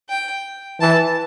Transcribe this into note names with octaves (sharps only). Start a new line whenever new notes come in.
G5
E3 A5